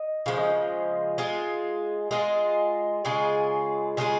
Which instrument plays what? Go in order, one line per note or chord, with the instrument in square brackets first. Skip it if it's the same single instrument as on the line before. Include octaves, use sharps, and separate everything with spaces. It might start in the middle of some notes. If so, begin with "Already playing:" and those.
Already playing: [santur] D#5
[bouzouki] C#3 F3 G#3 [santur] F5
[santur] D#5
F5
[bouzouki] G#3 F4 G#4
[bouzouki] G#3 F4 G#4 [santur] D#5
[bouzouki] C#3 G#3 F4 G#4
[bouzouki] C#3 G#3 F4 G#4 [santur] C#5